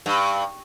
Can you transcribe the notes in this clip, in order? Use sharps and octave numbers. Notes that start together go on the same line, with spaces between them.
G2